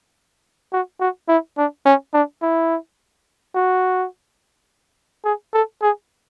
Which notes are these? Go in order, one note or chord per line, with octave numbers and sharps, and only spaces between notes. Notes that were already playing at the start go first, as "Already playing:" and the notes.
F#4
F#4
E4
D4
C#4
D4
E4
F#4
G#4
A4
G#4